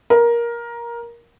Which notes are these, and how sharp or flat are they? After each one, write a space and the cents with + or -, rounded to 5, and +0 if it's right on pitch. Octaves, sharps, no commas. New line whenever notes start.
A#4 +15